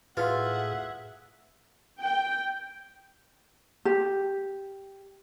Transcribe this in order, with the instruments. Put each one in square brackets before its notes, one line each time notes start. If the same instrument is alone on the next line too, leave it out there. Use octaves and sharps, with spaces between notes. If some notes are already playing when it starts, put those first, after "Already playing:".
[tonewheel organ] A2 G#4 [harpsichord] F4 [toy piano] F#4 B4 [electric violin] E5 F#5
[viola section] G5
[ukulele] G4